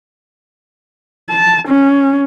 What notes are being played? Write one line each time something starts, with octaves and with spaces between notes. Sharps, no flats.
A5
C#4